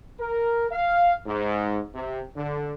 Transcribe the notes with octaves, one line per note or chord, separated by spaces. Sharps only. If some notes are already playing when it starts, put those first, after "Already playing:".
A#4
F5
G#2
C3
D3